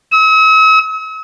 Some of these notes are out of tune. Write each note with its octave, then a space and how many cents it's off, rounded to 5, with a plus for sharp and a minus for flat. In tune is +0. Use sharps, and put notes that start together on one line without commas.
E6 -45